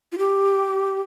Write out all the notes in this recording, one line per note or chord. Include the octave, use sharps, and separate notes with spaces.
F4
G4